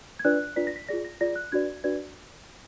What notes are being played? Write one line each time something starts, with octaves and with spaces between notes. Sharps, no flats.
G#6
D4 F4 B4 D5 F#6
D4 F4 B4 D5 B6
A#6
B6
F4 G#4 D5 A#6
A#6
F4 G#4 D5 A#6
F#6
D4 F#4 B4 D5 G#6
D4 F#4 B4 D5 G#6